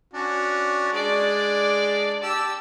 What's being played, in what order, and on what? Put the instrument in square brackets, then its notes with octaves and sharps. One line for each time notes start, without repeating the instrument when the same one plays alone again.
[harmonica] C#4 D4 F#4
[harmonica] G#3 D4 [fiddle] D5
[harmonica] G4 A5 [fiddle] E6